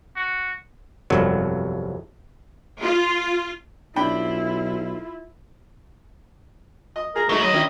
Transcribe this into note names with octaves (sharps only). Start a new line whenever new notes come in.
F#4
G1 C2 F2 F#3
F4
B1 D4 E4 F4 G5 B5
D#5
G#4 A#4 A#5
F#2 F#3 G#3 A3 D#4
D#2 F#3 D#5
D#3 C#4 D4 E4